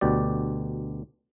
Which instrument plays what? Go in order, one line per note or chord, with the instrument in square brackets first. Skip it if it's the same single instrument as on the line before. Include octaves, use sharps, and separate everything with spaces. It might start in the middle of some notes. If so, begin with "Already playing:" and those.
[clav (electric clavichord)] D2 B2 G4 D5